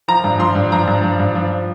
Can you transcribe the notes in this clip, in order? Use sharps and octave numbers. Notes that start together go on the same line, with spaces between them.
F3 A#5
G2
F3 C6
G2
F3 A#5
G2
F3
G2
F3